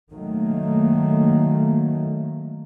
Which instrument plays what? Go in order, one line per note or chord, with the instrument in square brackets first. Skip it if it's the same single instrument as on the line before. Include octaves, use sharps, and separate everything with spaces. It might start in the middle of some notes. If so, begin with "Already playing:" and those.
[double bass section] D#3 F#3 A3 A#3